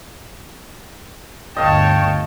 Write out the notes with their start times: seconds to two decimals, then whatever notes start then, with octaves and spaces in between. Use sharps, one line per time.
1.57 G1 D2 C#5 D#5 F5 G5 A5